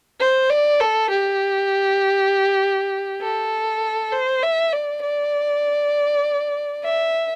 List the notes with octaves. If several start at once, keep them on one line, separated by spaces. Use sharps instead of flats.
C5
D5
A4
G4
A4
C5
E5
D5
D5
E5